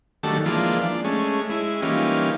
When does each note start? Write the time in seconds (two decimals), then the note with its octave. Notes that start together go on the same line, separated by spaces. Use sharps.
0.23 D#3 F#3 G3 A3 D4 A4
0.46 E3 F3 G#3 A#3 D4 F4
0.81 D4
1.04 G#3 A3 C#4
1.50 G#3 E4
1.82 E3 G3 A#3 C#4 D#4 F4